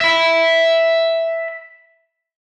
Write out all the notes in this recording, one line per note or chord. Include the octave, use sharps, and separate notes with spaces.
E5 B5